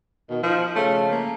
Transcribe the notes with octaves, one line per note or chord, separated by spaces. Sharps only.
B2 D#3
F3 D#4
C#3 A3
A#3